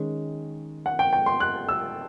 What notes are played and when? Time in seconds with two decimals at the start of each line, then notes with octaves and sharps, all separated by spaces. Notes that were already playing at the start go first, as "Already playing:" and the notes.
Already playing: D#3 G#3 C#4
0.86 F#5
0.99 G5
1.13 G5
1.26 C6
1.40 F#6
1.69 E6